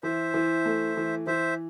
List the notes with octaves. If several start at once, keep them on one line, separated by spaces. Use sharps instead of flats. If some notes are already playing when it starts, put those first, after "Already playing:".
E3 C5 E5
E3
A3
E3
E3 C5 E5